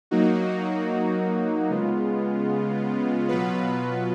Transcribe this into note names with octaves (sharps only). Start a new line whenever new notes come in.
F#3 A#3 D#4 F#4
C#3 G#3 B3 F4
B2 F#3 B3 F4 B4